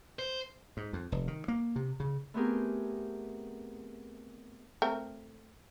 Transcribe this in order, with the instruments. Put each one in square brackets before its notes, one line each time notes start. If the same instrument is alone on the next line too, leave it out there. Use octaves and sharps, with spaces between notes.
[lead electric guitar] C5
[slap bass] G#2
F2
F1
D#3
A#3
C3
C#3
[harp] A3 B3 C4 G4 G#4 A#4
[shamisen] A3 C4 A#4